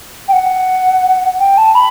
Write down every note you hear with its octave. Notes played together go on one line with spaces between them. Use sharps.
G5
F#5
G5
A5
B5